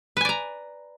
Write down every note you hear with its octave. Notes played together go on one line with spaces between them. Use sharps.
B4 D5 G#5 A#5